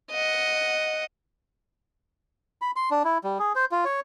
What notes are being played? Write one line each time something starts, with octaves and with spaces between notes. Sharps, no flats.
D#5 F#5
B5
C6
D4
E4
G3
G#4
C5
F4
C#5